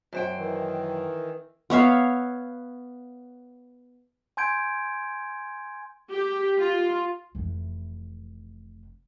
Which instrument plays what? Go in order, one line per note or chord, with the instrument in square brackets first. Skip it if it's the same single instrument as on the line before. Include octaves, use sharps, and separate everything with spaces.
[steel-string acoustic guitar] F#2 C5 G5
[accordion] D#3 E3
[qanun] B3 C#5 E5 F5
[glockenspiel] G#5 C6 G6 G#6 D7
[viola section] G4
F4
[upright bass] F1 E3